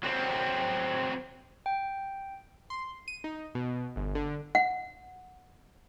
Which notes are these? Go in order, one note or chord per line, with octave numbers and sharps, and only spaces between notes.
F#3 C4
G5
C6
D#7
D#4
B2
G1
D3
F#5